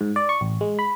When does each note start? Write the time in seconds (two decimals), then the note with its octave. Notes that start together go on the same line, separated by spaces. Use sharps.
0.01 G#2
0.16 D5
0.29 C#6
0.41 A1
0.61 G#3
0.79 B5